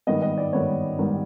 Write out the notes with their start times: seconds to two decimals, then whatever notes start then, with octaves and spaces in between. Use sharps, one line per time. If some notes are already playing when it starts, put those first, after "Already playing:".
0.07 G#2 D#3 G3 B3 D#5
0.22 D#5
0.38 D5
0.53 G#2 D#3 G3 B3 C#5
0.99 G#2 D#3 G3 B3